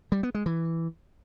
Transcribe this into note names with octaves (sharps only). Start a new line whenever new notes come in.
G3
B3
G#3
E3